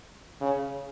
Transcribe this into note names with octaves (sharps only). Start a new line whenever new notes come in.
C#3